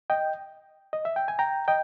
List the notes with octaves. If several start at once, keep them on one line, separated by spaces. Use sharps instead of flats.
D#5 G5
D#5
E5
G5
G#5
G5 A#5
D#5 G5